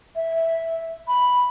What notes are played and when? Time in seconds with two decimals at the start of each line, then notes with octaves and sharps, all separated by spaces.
0.15 E5
1.08 B5